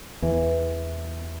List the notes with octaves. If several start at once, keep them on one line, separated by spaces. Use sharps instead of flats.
E2 E3